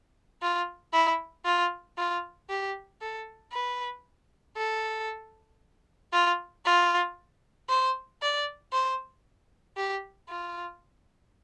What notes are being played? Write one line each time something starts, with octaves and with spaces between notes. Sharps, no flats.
F4
E4
F4
F4
G4
A4
B4
A4
F4
F4
C5
D5
C5
G4
F4